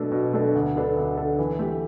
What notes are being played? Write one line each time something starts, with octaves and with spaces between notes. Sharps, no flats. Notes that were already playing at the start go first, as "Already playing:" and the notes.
Already playing: B2 A3 D4 A4
B2
A3 D4 A4
D2
D3 B3 D4 A4
D2
D3 B3 D4 A4
E3
A3 G4